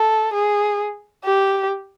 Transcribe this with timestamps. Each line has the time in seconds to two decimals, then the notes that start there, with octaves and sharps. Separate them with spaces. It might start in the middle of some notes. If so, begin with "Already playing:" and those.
Already playing: A4
0.33 G#4
1.25 G4